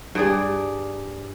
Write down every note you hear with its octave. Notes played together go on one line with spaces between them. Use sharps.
G2 G#4 D5